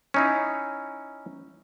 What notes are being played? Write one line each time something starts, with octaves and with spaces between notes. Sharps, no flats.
C#4 D#4 E4